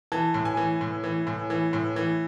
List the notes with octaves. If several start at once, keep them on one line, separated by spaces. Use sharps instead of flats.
E3 A5
A2
G#5
E3
A2
E3
A2
E3
A2
E3